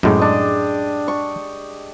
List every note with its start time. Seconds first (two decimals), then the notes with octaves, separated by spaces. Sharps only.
0.03 F#2 A2 G#3 G4
0.19 D4 D#5
1.08 C#6